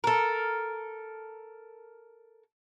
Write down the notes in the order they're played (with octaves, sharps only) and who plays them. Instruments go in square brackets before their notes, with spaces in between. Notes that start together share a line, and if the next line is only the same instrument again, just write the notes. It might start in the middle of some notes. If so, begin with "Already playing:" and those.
[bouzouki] A4 A#4